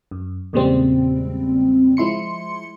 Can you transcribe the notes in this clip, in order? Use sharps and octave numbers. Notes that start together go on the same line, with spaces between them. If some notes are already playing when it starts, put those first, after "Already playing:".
F#2
E2 A#2 C#3 G3 G#3 C4
F3 G#3 E4 C6 C#7